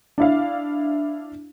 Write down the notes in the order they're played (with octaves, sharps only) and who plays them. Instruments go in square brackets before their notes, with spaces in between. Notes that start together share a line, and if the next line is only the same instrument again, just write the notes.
[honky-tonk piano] D4 E4 F5